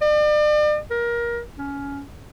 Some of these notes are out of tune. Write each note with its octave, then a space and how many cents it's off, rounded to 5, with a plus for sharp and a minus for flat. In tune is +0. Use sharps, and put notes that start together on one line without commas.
D5 +40
A#4 +20
C#4 +20